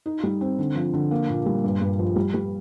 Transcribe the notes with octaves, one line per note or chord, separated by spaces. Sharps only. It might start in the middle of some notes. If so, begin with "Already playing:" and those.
D#4
G3
C4
D3
F3
D3
A#3
A#2
G3
G2
G2
F3
G3
G3